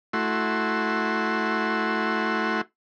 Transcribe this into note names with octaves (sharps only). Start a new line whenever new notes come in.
A3 E4 F#4 C6